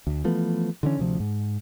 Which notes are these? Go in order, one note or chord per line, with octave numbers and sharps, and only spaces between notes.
D2
E3 F3 A3 B3
D3 E3 C#4
D2 C3 F3
G#2